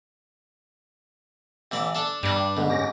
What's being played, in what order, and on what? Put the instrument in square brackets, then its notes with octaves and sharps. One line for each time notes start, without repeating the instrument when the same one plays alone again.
[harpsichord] A1 E3 D5
D4 A4
[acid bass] G2 [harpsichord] G3 D4
[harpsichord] G#2 [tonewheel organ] D3 B3
[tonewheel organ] C#4 G4 A#6